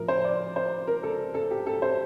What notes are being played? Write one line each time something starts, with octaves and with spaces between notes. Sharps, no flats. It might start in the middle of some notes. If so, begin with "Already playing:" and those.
Already playing: A2 F3 A#4
C5
D5
C5
A#4
A4
A4
G4
A4
C5